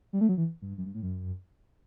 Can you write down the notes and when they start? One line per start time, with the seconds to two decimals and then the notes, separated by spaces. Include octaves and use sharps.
0.13 G3
0.21 A3
0.29 F#3
0.37 E3
0.62 G2
0.78 F#2
0.86 G2
0.94 A2
1.03 F#2